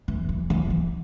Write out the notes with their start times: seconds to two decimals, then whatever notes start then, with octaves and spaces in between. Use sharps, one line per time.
0.08 E3
0.29 E3
0.50 E3
0.70 E3